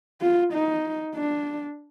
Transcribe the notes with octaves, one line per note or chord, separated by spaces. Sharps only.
F4
D#4
D4